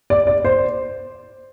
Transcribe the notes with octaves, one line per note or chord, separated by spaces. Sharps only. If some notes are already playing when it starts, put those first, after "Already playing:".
D5
D5
C5